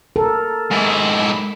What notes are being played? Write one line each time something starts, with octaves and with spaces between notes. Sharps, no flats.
A4 A#4
G#2 E4